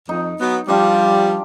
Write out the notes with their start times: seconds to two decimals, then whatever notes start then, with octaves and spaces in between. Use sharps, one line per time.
0.09 F2 D#4
0.40 F#3 B3
0.68 F3 G3 D4 F4 G4